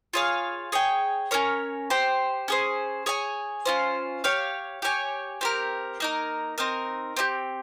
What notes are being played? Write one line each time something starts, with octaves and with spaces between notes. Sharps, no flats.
F4 G#4 C#5 F5
G#4 C#5 G5
C#4 F4 A#4 C#5
G4 C5 G5
C#4 G#4 C5
G#4 C#5 G#5
C#4 F4 C5
G4 C#5 F5
G4 C#5 G#5
C4 G4 A#4
A#3 D#4 A#4
C4 D#4 A#4
C4 D#4 G4